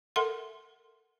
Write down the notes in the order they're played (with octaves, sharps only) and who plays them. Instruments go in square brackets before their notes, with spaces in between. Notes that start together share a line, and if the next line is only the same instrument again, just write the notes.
[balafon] A4 A#4 E5 F#5 C6